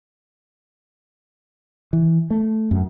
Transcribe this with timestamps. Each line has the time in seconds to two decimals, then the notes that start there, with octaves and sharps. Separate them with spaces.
1.93 E3
2.30 A3
2.71 F#2